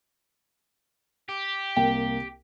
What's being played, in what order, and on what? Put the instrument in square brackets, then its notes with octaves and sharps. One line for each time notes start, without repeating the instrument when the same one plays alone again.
[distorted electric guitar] G4
[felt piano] C2 A#3 [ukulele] G5